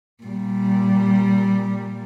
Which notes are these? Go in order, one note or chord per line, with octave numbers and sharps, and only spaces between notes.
A#2 G3